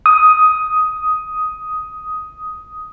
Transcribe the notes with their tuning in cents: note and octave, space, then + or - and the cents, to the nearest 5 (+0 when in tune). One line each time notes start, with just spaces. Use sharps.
D#6 +10